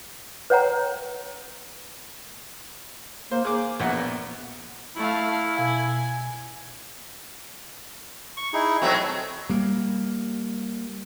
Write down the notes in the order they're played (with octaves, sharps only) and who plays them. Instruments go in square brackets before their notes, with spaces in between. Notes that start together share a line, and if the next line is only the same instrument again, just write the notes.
[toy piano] B4 C#5 F#5 G5 A#5
[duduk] A#3 [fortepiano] C5
[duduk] A#3 [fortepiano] G#4 D6
[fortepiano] A#1 A#2 F#5 [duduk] B3
[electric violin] A3 F5 [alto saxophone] E4
[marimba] B2 F5 E6 [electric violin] G#5
[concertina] C#6
D#4 E4 G#4
[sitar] B2 F#3 A3 [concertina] C4 F#4
[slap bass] G3 A#3